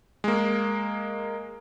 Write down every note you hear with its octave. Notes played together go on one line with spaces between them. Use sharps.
G#3 A#3